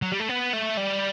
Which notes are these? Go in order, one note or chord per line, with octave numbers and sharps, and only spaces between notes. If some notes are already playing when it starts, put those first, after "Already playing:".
F#3
G3
A3
B3
A3
G3